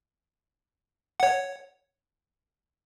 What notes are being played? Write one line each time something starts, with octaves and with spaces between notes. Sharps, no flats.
C#5 F#5